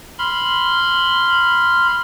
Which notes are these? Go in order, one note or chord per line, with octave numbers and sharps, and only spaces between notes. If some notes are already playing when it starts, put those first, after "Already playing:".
B5 C6 F6